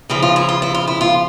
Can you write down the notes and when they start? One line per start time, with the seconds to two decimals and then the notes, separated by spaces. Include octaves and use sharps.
0.10 C#3 F3 E4
0.22 F4
0.36 E4
0.49 F4
0.62 E4
0.75 F4
0.88 E4
1.01 F4